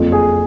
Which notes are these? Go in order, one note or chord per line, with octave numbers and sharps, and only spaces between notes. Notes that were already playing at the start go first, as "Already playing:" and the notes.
Already playing: F#1 F2 F3
G#4